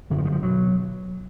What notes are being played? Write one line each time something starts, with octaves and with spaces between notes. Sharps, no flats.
G#1 F#2 D3 F#3
F3
D#3
F3
B2 F#3